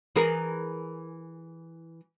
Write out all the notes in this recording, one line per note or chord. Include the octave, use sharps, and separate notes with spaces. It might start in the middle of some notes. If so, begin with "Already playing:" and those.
E3 G#4 A#4